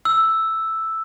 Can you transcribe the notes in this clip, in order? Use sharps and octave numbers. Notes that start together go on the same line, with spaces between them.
E6